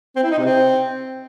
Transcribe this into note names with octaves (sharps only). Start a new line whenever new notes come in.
C4
E4
D#4
C3
C4